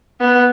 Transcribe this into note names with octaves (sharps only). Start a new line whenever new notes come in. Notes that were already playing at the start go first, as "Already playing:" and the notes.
B3